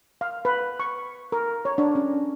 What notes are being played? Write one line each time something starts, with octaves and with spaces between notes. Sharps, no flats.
F5
B4
C#6
A#4
C#5
D4
C#4